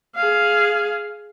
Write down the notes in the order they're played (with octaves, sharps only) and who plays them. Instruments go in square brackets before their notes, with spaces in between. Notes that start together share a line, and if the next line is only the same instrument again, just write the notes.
[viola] G#4 F5